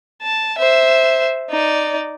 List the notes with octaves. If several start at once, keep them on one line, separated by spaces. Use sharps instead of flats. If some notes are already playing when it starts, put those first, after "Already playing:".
A5
C5 E5
D#4 D5